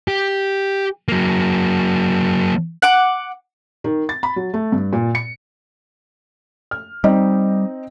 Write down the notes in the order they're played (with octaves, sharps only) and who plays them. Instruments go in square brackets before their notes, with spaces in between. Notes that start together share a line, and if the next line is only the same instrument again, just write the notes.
[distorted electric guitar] G4
F#3 A#3
[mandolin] F#5 D6
[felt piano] D#3
A6
B5
F#3
A3
G2
A#2
C#7
F6
[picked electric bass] G3 [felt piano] C4 D#4 D#5